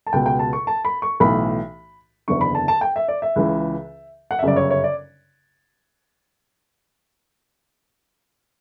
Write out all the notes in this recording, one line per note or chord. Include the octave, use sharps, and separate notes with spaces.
A5
C#2 B2 G5
G5
A5
C#6
A5
B5
C#6
B1 A2 E3 B5
F#1 E2 D3 C#6
B5
A5
A5
G5
E5
D5
E5
C#2 C#3 E3
F#5
E5
G1 F#2 C#3 D5
C#5
C#5
D5